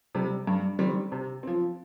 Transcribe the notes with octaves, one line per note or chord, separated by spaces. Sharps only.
C3 G3
G2
D#3 G3 C4
C3
F3 C4